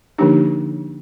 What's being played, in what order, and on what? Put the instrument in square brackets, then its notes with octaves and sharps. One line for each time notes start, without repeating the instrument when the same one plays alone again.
[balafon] D3 F3 A#3 D4 D#4 G4